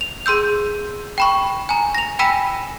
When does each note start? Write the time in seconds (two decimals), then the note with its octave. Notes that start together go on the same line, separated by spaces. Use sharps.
0.01 F7
0.26 G#4 C6 E6 G6
1.18 G5 B5 C#6
1.69 G#5 A#5
1.95 A#6 F7
2.19 G5 G#5 B5 E6 B6 D#7